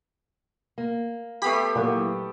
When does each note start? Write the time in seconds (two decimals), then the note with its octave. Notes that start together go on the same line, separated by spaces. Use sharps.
0.78 A#3
1.42 A3 B3 G4 B5 B6 C7
1.76 A#2 E3 F#3 A#3